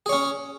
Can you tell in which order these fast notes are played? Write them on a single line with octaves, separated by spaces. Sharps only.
G#4 C#5 C#4